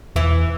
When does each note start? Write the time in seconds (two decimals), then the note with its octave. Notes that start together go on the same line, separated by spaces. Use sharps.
0.16 E2 E3